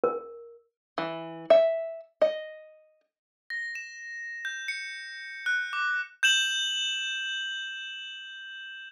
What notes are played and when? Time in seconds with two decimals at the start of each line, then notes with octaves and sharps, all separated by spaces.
0.04 A#4
0.98 E3
1.50 E5
2.22 D#5
3.50 A#6
3.75 E7
4.45 G6
4.68 C#7
5.46 F#6
5.73 D6
6.23 G6 E7 F#7